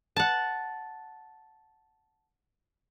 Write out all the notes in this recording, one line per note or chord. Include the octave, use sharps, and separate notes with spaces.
F#5 A5